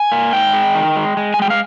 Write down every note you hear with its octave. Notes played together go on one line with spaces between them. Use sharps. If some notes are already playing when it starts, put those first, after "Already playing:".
Already playing: G#5
A#3
G#2 G5
G#3
D#3
G#3
G#3
G#5
G#3 G5
F5